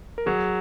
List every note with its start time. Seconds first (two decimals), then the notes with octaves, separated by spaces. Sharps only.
0.18 A#4
0.26 F#3 G#4